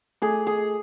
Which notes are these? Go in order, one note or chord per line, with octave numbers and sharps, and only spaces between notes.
A3 G#4 A4
G#4